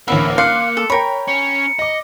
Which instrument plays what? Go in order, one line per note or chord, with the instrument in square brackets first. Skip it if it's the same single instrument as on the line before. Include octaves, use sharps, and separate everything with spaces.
[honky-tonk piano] A1 D2 F#5 [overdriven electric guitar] A#3 [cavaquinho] E5 [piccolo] B5
[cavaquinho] F5 [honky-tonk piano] C6 D6 F#6 [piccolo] C#7
[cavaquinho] A4
[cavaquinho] A#4 B5 [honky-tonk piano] C#5 G5
[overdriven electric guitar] C#4 [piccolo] C#7
[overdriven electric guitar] D#5 [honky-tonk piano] D6 A#6